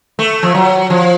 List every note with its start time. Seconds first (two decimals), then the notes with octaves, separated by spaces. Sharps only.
0.19 A3
0.43 F3
0.55 F#3
0.90 F3